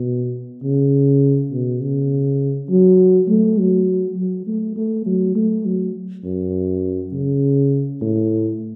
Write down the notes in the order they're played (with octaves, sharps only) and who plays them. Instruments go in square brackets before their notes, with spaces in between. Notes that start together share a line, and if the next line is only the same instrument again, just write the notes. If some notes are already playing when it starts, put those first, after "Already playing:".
Already playing: [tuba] B2
C#3
B2
C#3
F#3
A3
F#3
F#3
A3
A3
F#3
A3
F#3
F#2
C#3
A2